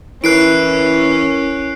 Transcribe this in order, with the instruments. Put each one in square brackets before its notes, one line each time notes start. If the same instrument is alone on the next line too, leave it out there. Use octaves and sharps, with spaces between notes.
[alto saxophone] E3 [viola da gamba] C#4 [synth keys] E4 A#4 [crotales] F#6 C7 D7